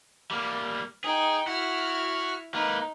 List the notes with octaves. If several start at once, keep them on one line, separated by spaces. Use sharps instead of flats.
G3 A#3
D#4 G#4 G5
E4 F#4 F6
A#3 D#4 B4